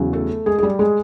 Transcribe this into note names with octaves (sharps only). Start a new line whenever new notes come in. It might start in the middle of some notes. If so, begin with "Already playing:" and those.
Already playing: E2 C#3 F#3
A3 A4
G#3 G#4
G#4
G3 G4
G#3 G#4